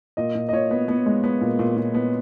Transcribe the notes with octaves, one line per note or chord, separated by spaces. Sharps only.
A#2 D#5
A#2
D#5
A#2 C#5
B3
B3
G#3
B3
A#2
A#2
A#2
B3